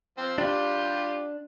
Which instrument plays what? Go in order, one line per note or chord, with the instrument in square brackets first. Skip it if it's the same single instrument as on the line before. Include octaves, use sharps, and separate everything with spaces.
[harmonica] F3 C4
[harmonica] G3 F4 G4 [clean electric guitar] D4